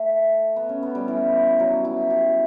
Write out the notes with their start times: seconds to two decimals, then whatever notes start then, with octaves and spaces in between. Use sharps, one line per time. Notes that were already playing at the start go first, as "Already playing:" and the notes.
Already playing: A3
0.56 B3
0.69 C#4
0.83 B3
0.95 G3
1.08 E3
1.60 F#3
1.85 E4
2.10 G4